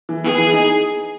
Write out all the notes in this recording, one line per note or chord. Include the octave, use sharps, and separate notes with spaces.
E3
B3 G#4
E3
D#4